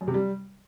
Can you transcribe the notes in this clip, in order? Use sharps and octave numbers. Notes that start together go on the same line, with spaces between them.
F#2
C3
G3